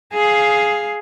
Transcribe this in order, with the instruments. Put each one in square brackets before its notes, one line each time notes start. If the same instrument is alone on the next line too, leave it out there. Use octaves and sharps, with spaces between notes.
[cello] G#4 F5